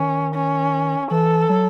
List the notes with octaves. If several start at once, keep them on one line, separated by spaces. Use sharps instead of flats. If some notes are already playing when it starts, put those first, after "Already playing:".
Already playing: D#3 C#4
C#4
E3 A4
F#3